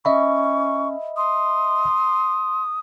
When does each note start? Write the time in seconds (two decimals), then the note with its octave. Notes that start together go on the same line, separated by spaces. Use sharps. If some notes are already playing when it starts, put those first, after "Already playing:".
0.05 C#4 D#5 E5 B5 C#6
1.16 C6 D#6